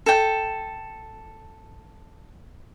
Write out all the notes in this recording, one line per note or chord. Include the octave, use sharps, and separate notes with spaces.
A4 G5